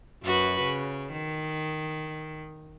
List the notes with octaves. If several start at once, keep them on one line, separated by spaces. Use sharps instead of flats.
F#2 F#4 B4
C#3
D#3